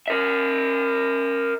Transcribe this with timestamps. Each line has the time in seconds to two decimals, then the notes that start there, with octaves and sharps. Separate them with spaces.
0.08 A#4 E5